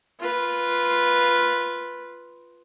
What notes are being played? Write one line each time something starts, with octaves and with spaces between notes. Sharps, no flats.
F4 B4